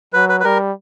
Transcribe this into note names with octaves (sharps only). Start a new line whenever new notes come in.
F#3 B4
B4
B4
G3 A#4